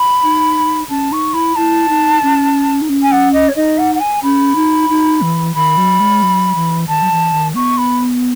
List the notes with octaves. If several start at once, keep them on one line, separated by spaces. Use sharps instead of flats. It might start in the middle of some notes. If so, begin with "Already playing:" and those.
Already playing: B5
D#4
C#4 A5
D#4 C#6
E4 B5
E4 A5
D#4
C#4
D#4
C#4
G#5
F#5
D#5
C#5
D#4 D#5
F#5
F#5
G#5
C#4 B5
D#4
D#4
E3
D#3 B5
F#3
G#3
F#3
E3
D#3 A5
F#3
E3
D#3
B3 C#6
B5